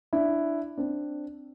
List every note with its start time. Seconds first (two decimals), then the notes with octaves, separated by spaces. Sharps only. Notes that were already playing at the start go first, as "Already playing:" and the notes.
0.13 D4 E4
0.78 C4 D4